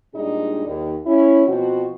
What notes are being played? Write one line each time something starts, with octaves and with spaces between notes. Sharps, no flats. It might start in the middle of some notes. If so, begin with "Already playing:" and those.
A#2 G3 G#3 D4 D#4 G#4
D#2
C#4 E4
B2 F3 C4 F#4